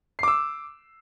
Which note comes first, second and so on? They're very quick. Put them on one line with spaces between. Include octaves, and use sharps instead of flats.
C7 D6 E6